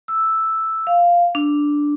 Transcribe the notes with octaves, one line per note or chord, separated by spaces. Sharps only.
E6
F5
D4